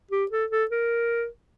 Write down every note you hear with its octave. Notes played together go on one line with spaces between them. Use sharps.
G4
A4
A4
A#4